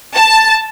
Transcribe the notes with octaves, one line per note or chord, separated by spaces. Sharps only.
A5